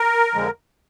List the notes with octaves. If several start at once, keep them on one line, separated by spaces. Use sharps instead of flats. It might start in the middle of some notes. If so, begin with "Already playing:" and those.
Already playing: A#4
F2 D3 F3 G#3